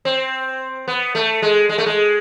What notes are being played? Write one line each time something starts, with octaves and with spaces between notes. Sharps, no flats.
C4
B3
A3
G#3
G#3
A3
G#3